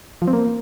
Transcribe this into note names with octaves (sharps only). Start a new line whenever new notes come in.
F3
C4
A#3